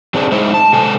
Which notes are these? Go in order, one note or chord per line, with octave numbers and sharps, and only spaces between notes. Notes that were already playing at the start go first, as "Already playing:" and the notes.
F#3 C4 D4 G#4 C5
G#3 D#4 E4 C5 E5
A5
C3 G#3 A4 G#5